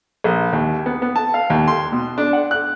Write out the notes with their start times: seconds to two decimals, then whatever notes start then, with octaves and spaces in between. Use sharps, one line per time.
0.24 A#1
0.53 D#2
0.86 B3
1.02 B3
1.16 A5
1.34 F5
1.50 D#2
1.68 C6
1.92 B2
2.18 D4
2.33 F#5
2.51 F#6